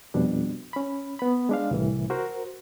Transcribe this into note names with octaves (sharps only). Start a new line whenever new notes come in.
F2 B2 G3 D4
C#4 B5
B3 B5
G#3 D4 F5
C2 A2 E3
F#4 A#4 C5